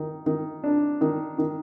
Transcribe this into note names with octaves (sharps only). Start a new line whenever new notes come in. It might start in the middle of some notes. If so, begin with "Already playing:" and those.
Already playing: D#3
D#3
D4
D#3
D#3